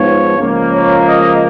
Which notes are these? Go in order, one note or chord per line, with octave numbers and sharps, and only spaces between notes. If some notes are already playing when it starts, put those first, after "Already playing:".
Already playing: G#2 F3 B3 C#5
C#2 C#3 F3 A#3
C#5
D#5